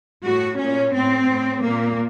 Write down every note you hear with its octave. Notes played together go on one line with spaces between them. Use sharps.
A2 F#4
A#2 C#4
A2 C4
A2
A#2 A#3